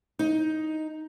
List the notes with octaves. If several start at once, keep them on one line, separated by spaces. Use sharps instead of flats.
D#4